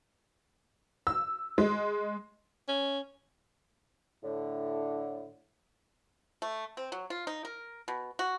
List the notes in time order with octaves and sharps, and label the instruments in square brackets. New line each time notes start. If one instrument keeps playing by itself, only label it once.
[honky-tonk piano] E6
G#3
[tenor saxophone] C#4
[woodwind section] A2 D3
[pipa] A3
C4
F#3
F4
D#4
A#4
B2
F#4